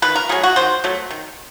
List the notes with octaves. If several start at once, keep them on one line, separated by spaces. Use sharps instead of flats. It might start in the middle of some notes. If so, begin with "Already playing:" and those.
D#3 B4
A#4
F#3 A3 G#4
F#4
D#3 C5
F#3 A3
D#3